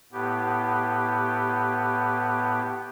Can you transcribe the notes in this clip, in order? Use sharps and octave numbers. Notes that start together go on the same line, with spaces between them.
A2 B3 G4